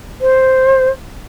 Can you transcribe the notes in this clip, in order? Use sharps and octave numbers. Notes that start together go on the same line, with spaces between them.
C5